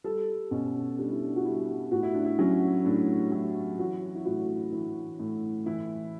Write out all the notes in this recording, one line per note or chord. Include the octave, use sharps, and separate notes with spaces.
G3 A4
B2 C#4
G3 D4
E4
D4
F#4
G3 E4
A2 F#4
E4
D4
E4
F#3 C#4
A2 D4
F#3 E4
E3 F#4
E4
A2 F#4
E3
A2
E3 E4